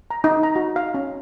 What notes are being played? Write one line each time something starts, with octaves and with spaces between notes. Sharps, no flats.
A#5
D#4
A#5
F#4
F5
C#4